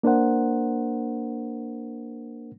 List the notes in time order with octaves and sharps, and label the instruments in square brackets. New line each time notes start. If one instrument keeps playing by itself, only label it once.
[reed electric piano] A#3 D4 A#4 C5 F#5